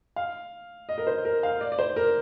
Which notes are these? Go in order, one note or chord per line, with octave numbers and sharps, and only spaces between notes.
F5
D#5
A#4
C5
A#4
F5
D5
D5
C5
A#4